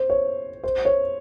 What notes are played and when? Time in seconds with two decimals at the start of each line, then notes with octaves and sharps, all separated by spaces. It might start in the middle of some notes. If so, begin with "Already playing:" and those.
Already playing: C5
0.10 C#5
0.64 C5
0.85 C#5